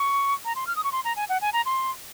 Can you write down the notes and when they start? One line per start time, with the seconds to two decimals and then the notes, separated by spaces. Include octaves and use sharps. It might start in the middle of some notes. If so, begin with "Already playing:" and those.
Already playing: C#6
0.45 A#5
0.55 C6
0.67 F6
0.76 D#6
0.84 C#6
0.92 C6
1.05 A#5
1.16 G#5
1.29 F#5
1.41 G#5
1.53 A#5
1.65 C6